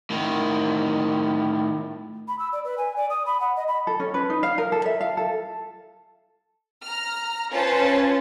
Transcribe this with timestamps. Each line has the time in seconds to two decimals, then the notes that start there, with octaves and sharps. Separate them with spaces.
0.10 A2 D#3
2.28 B5
2.39 E6
2.52 D5
2.64 B4
2.77 G#5
2.96 D5
3.10 D#6
3.26 B5
3.40 F#5
3.56 D#5
3.67 B5
3.87 A4
4.00 C#4
4.14 B4
4.30 D#4
4.43 F5
4.58 A#4
4.72 A4
4.86 E5
5.01 F5
5.17 A4
6.82 A#5 F6
7.52 C#4 F4 B4 C5 A5